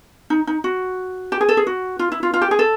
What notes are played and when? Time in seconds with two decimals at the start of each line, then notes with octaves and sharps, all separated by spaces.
0.30 D#4
0.47 D#4
0.64 F#4
1.32 G4
1.41 G#4
1.49 A4
1.57 G#4
1.67 F#4
1.99 F4
2.12 E4
2.23 F4
2.34 F4
2.42 G4
2.51 G#4
2.59 A4